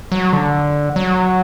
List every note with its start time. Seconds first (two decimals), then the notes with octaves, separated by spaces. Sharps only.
0.12 F#3
0.33 D3
0.96 F#3